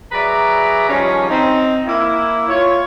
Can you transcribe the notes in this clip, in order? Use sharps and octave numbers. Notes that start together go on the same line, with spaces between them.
F#3 G#4 B4 D5 E5 A#5
D#3 F3 G3 C#4
C4 D#4
A#3 E4
F4 C#5